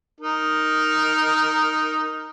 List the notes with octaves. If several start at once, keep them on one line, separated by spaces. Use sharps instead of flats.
D#4 A#4